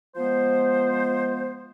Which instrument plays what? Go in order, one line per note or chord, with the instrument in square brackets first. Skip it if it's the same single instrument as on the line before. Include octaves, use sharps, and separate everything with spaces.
[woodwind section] F3 G#3 B3 C5